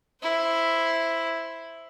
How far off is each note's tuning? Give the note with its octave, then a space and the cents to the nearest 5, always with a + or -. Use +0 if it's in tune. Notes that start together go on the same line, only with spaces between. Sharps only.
E4 +0 C5 +0